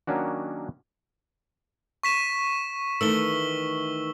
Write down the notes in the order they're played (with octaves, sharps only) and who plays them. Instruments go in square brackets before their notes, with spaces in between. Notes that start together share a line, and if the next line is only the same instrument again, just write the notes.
[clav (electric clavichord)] D#3 F#3 A#3 C#4 D4 F#4
[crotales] C#6 B6 E7
[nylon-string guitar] D#3 E3 A3 [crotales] E6 G7